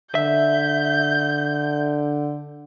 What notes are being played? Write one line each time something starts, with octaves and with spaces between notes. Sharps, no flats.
D3 E5 G6